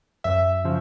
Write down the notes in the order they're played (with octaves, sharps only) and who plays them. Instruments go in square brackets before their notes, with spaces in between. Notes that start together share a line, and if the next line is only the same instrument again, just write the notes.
[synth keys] F#2 E5
C#3 F3